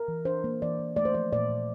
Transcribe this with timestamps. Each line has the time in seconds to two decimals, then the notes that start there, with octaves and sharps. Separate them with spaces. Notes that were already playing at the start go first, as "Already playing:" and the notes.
Already playing: A#4
0.08 E3
0.25 D4 C5
0.44 A#3
0.62 E3 D5
0.79 E3
0.96 A3 D5
1.05 C5
1.14 F3 D5
1.32 A#2 D5
1.50 A#2